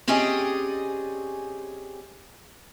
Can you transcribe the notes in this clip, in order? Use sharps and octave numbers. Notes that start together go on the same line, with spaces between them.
C4 C#4 G4 G#4 D5 D#5